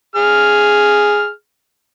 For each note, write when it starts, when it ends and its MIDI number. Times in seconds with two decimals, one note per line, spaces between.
0.16 1.30 68
0.16 1.30 89